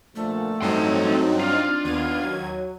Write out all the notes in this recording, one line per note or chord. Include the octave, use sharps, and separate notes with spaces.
A#2 D3 F3 A3
G2 F#3 C4 D#4 A4 C6
D4 F4
D#2 B3 G#6 D#7
F#3